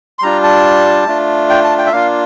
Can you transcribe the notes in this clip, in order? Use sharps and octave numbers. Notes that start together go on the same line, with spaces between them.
C6
G3 D4 F4 A#5
A5
A3 D4 F4
G5
A5
G5
E5
A#3 D4 F4 F5